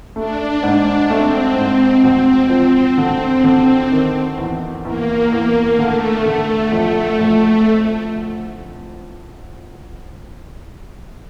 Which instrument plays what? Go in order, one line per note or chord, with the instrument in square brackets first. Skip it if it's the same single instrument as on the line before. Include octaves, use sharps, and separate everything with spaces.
[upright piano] A3 [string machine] D4
[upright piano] G#2
[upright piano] A3 [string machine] C4
[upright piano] G#2
[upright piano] D2 [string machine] C4
[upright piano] F3
[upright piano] D3 [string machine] C4
[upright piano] D3
D#3
E2
[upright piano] E2 [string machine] A#3
[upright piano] E2
[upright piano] D3 [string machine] A3
[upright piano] D3
[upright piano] F2 [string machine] A3
[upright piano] F2